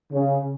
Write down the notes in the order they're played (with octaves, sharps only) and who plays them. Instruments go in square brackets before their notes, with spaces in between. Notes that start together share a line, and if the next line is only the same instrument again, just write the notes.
[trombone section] C#3